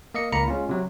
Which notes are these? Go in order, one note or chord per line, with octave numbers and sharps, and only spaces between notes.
A#3 D#5 C#7
C#2 A#3 A#5 B5 C#7
G#3 C#4 F4
C3 F#3